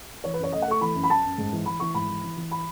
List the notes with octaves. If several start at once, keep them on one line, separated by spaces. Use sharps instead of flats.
E3 C#5
B4
F#2 C#5
A3 D#5
F#5
A3 C#6
E3 B5
F#2
B5
F#2 A5
F#2
G#2
E3
E3 B5
E3 C#6
G#2 B5
E3
E3
E3
B5